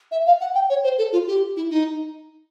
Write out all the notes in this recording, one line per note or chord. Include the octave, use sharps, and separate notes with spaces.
E5
F5
F#5
G5
C#5
C5
A4
F4
G4
E4
D#4